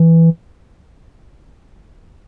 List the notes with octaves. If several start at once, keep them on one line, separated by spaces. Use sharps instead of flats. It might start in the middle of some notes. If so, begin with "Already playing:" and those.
Already playing: E3